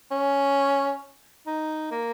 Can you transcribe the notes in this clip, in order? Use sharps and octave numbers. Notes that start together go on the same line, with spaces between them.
C#4
D#4
A#3